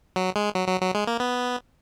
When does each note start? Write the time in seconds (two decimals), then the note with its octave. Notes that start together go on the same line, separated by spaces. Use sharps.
0.16 F#3
0.36 G#3
0.55 F#3
0.68 F#3
0.81 F#3
0.95 G#3
1.07 A#3
1.20 B3